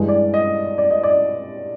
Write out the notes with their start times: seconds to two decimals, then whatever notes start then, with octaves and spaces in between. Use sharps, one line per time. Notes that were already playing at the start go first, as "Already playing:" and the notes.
Already playing: G2 E3 G#3
0.08 D5
0.34 D#5
0.78 D5
0.91 D#5
1.03 D5